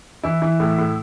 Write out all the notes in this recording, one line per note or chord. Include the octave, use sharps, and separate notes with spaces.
E3 E4
E3
A2
A2